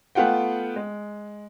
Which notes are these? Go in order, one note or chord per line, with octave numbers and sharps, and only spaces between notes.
A3 B3 F4 F#5 G5
G#3